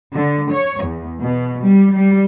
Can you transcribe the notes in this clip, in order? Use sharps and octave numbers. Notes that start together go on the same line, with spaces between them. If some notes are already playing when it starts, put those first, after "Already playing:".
D3
C#5
E2
B2
G3
G3